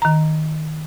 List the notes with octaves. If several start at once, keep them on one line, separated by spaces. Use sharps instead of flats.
D#3 A#5